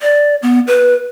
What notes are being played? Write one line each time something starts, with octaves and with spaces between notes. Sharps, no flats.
D5
B3
B4